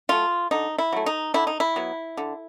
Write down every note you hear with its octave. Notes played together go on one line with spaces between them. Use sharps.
F#3 A3 F4
D3 D#4
E4
F#3 A3
D#4
D3 E4
D#4
E4
F#3 B3
D3